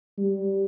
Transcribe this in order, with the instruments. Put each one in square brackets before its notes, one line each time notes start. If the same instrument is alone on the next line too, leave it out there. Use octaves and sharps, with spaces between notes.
[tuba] G3